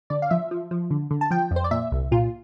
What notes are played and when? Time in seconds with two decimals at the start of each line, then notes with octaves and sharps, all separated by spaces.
0.10 D3 D5
0.22 F5
0.30 F3 E5
0.51 F3
0.71 F3
0.91 D3
1.11 D3
1.21 A5
1.31 F3 G5
1.51 F2
1.56 C5
1.64 D5
1.71 A#2 E5
1.92 C2
2.12 A#2 F4